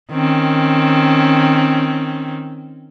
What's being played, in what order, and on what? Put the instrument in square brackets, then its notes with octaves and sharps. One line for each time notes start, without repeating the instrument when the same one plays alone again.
[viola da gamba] D#3 C4 C#4